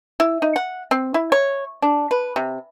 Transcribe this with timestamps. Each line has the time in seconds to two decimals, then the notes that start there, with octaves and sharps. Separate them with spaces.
0.20 E4
0.42 D#4
0.56 F#5
0.91 C4
1.14 E4
1.32 C#5
1.82 D4
2.11 B4
2.36 C3